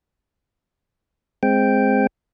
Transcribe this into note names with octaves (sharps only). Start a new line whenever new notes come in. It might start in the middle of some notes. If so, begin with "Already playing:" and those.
G#3 C4 G5